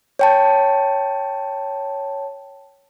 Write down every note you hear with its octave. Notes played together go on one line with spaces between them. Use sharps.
C#5 G5 A5